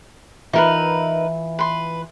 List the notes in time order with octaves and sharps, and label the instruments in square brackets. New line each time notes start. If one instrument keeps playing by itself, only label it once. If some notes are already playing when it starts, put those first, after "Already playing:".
[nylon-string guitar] E3 F4 E5 [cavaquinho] D#4 A#4 B4
[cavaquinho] B4 C6